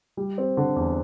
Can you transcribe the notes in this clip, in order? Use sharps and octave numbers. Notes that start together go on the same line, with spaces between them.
G3
C4
D3
E2